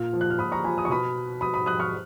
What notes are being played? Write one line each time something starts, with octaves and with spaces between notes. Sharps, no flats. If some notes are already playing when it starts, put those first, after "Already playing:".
Already playing: A#2 F6
F3
F#6
F6
A#2 B5 D#6
A#5 C#6
F3 G#5 B5
D#6
C#6
B2 B5 D#6
B2 B5 D#6
B5 D#6
D#6 F#6
C#6 F6